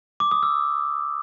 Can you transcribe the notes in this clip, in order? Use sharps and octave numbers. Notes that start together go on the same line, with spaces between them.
D6
D#6
E6